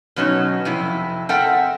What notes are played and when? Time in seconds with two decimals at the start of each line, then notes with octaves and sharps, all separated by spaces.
0.16 B2 F#3 C#4 D#4
0.65 F2 C3 E4
1.29 C4 A4 A#4 E5 F#5 G5